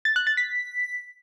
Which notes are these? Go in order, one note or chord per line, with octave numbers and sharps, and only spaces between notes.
A6
F#6
A6
B6